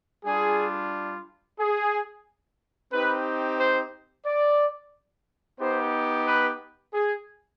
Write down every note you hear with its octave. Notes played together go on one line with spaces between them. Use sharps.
G3 D4 F4 G#4
G#4
C4 D#4 G4 B4
C5
D5
B3 D#4 G4 C5
B4
G#4